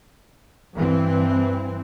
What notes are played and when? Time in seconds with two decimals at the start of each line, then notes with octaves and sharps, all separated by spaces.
0.76 G2 E3 C4